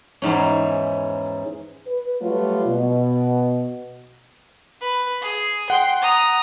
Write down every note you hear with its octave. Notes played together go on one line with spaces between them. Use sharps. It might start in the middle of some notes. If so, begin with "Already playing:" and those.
E2 G#2 C#4
B4
F#3 G3 A3 F4 B4
B2
B4
G#4
F#5 G5 C6
A#5 D#6